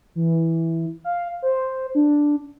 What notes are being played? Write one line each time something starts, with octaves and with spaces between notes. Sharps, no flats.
E3
F5
C5
D4